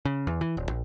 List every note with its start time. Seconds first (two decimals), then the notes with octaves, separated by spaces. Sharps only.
0.05 C#3
0.27 E2
0.41 E3
0.57 D#1
0.69 A#1